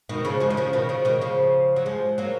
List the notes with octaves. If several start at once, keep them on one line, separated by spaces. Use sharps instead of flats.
B2 D#3
C#3 F3
F3 G#3
D#3
C#3 F3
B2 D#3
C#3 F3
B2 D#3
C#3 F3
F#3
F3 G#3
F#3 A#3